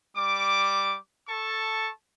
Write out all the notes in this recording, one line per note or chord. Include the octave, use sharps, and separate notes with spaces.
G3 D6
A4 A5 C#6